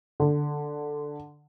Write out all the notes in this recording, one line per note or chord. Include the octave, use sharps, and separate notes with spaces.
D3